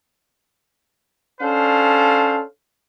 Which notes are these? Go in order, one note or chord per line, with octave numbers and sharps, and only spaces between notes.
C#4 D4 A4 C5 F5